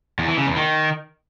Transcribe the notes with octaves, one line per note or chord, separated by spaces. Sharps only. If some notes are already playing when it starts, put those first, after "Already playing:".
E2
E3
C#3
E2
D#3